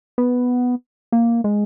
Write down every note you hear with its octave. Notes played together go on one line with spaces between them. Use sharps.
B3
A#3
G#3